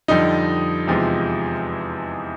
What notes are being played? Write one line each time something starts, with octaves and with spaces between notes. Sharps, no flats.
F2 D3 G3 D#4 D#5
E2 C3 F3 G#3